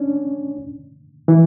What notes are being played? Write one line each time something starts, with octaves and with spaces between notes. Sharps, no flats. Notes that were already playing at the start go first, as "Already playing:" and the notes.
Already playing: C#4 D4
E3